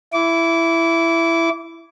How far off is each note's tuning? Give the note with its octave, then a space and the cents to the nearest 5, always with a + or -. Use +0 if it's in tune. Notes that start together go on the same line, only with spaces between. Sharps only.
E4 +10 D6 -25